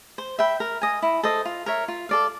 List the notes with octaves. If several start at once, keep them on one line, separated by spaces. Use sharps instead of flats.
C5
E5 G5 B5
A#4
D#5 G#5
E4
A4 C5 D#5
F4
A#4 C#5 E5
F4
A4 D5 F5